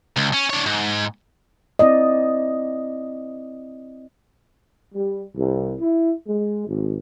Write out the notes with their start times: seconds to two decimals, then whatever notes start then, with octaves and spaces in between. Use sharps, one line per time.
0.17 C#2
0.33 C#4
0.50 D4 C#5
0.66 G#2
1.79 C4 E4 D5 D#5
4.94 G3
5.35 C2
5.81 E4
6.26 G#3
6.67 G#1